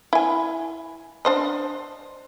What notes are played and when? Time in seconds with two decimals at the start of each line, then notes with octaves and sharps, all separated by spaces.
0.13 E4 G#5
1.25 D4 C5 D#5